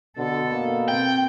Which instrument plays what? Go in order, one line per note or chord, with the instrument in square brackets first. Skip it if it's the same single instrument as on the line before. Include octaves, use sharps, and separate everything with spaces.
[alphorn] B2 [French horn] D3 [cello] A4
[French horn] A#3
[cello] C4 [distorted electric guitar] G5